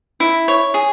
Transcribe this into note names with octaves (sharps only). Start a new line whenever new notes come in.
E4
C#5
G#4